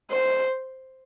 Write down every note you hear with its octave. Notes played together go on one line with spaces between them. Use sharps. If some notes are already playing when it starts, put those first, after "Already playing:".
C5